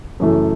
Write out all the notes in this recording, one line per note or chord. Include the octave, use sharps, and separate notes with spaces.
F#2 C#3 E3 A3